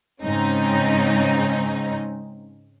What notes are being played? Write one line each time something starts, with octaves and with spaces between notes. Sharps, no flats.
G#2 C#3 C4 C#4 D#4